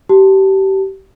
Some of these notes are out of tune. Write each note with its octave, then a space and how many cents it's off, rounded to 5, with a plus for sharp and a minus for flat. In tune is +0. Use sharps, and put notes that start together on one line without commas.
G4 -25 A5 +0